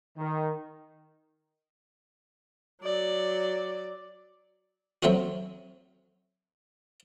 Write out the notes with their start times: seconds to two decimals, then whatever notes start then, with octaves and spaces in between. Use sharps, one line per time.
0.17 D#3
2.82 F#3 D5
5.03 F#3 A3 C4 C#4 F#4